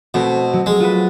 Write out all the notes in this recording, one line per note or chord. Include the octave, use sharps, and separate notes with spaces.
B2 A3 C4
F#3
G#3
F4 F#4 B4